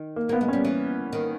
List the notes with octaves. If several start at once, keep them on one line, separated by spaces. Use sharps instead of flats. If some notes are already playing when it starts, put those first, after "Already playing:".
Already playing: D#3
A#3
A#3 B3
G#3
G3 C#4
E3
D#3